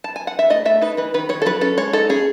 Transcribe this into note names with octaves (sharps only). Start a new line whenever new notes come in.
A5
G#5
F#5
E5
A3 D#5
A3 E5
D#4 B4
E3 B4
D#3 B4
D#3 C#5
A4
F#3 B4
C#4 A4
G#3 C#5
D#4 A4
C#4 G#4